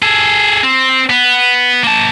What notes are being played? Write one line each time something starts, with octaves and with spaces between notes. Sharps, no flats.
G#4 A4
C4
B3
A#3 A5